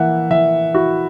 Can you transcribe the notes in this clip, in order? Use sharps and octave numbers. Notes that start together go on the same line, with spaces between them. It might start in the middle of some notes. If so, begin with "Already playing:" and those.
Already playing: E3 A#3 E5 F#5
E3 E5
E4 F#4